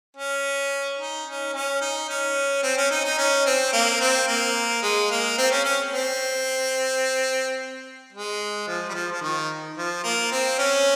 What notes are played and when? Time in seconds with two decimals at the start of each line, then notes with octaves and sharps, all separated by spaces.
0.17 C#4
0.98 D#4
1.26 C#4
1.53 C#4
1.81 D#4
2.09 C#4
2.63 C4
2.77 C#4
2.91 D#4
3.05 D#4
3.18 C#4
3.46 C4
3.73 A#3
4.01 C4
4.28 A#3
4.83 G#3
5.11 A#3
5.38 C4
5.51 C#4
5.65 C#4
5.92 C4
8.13 G#3
8.67 F3
8.89 G3
8.94 F3
9.12 F3
9.22 D#3
9.77 F3
10.04 A#3
10.32 C4
10.59 C#4